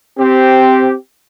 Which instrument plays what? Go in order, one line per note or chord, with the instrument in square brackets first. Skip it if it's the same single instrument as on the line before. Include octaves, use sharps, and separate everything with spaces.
[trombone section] C4 G4